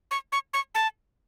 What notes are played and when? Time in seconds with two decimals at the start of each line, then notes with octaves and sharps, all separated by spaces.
0.11 C#6
0.32 C#6
0.53 C#6
0.75 A5